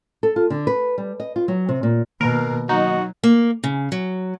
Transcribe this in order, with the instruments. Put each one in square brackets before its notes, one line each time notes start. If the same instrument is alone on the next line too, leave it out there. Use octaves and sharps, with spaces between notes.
[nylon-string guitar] A4
F4
D3
B4
G3
D#5
F4
F#3
C3
A#2
[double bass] B2 [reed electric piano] D#3 A#3 [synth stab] A#4
[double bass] F#3 [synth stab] D#4 [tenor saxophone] F#4
[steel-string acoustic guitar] A#3
C#3
F#3